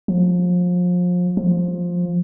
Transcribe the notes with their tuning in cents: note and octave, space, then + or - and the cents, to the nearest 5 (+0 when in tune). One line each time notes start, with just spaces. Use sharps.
F3 +30
F3 +10